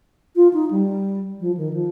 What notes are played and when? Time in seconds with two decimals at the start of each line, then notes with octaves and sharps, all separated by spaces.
0.36 F4
0.53 D#4
0.71 G3
1.40 F3
1.57 D#3
1.73 F3